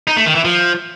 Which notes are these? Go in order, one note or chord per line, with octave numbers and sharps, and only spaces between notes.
D#4
A3
D#3
E3
F3